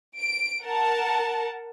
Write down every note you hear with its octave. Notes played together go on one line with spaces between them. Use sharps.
D7
A#4 F#5 A5